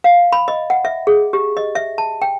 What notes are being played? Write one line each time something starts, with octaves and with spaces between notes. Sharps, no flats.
F5
B5
D#5
F#5
E5
G#4
G4
D#5
E5
A5
G5